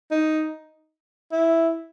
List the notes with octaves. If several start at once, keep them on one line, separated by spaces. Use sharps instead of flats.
D#4
E4